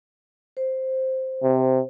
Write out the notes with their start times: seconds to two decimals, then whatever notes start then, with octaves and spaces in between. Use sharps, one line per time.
0.57 C5
1.43 C3